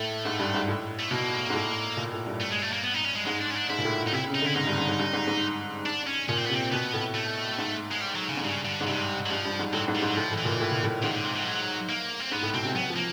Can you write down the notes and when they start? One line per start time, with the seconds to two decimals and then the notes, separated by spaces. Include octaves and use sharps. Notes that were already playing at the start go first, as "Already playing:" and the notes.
Already playing: A2 A3
0.25 G#2
0.39 G2
0.54 G#2
0.68 A2
0.99 A3
1.11 B2 A#3
1.50 G#2
1.54 A2
1.97 A#2
2.12 A2
2.27 G2
2.40 A3
2.52 G#3
2.62 A3
2.73 A#3
2.84 B3
2.94 D#4
3.05 C#4
3.16 G#3
3.26 G#2 G#3
3.41 D4
3.51 C#4
3.55 D4
3.70 G#2 E4
3.78 A#2
3.85 A2
4.08 D#4
4.12 C3 E4
4.27 C#3
4.35 D#4
4.42 D3
4.46 E4
4.56 G#2 D#4
4.67 G2
4.78 G#2
4.89 G#2
4.99 G2
5.13 G#2
5.27 G#2
5.86 D4
6.07 C#4
6.28 A#2 C#4
6.37 C4
6.46 C3 B3
6.54 C4
6.72 B2 B3
6.93 A2
7.15 A3
7.58 G#2
7.91 G#3
8.01 G3
8.15 F#3
8.29 C#3
8.37 G#2
8.44 G2 C#3
8.65 D3
8.81 G#2
8.87 G2 C3
9.26 F#3
9.30 G2 F3
9.45 G2
9.59 G#2
9.73 A2 F#3
9.88 G#2
9.95 G3
10.02 G#2
10.06 F#3
10.16 A2 F3
10.31 A2
10.38 E3
10.45 A#2
10.60 A2
10.72 A#2
10.83 A2
11.02 G#2 D#3
11.14 D3
11.24 C3
11.35 C3
11.41 F3
11.46 F#3
11.89 A#3
12.20 C4
12.32 G#2 B3
12.42 A2
12.54 B2 C4
12.65 C3
12.75 F#3 B3
12.90 F3
12.96 A#3